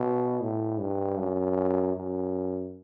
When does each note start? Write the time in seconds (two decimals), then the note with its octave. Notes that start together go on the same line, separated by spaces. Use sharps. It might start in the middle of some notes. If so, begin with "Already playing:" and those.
Already playing: B2
0.41 A2
0.80 G2
1.18 F#2
1.96 F#2